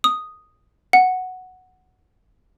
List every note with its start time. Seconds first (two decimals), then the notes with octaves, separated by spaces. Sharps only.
0.04 D#6
0.93 F#5